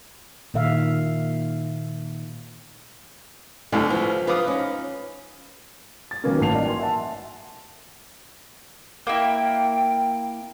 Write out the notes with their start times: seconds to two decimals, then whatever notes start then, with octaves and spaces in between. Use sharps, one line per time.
0.54 A#2 D#3 E5 F5
3.72 C2 F#2 A2 D3
3.90 F3 B4
4.27 F3 F4 B4 D6 D#6
4.47 C#4 D#4
6.11 A6
6.24 D#3 F#3 A#3 B3 C#4
6.41 A1 A5 C7 F7
6.55 D#4 F#4 A#4 D5
6.66 G#5 C6
6.80 E5 F#5 A5
9.07 A#3 E4 G5